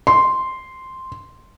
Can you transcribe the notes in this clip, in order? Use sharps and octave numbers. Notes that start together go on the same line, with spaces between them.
C6